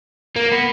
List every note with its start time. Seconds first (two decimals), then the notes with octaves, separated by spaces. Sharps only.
0.36 A#3
0.52 B3